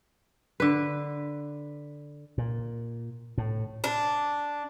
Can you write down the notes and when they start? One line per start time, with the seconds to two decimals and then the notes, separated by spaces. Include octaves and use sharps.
0.60 D3 B4
2.38 A#2
3.38 A2
3.84 D4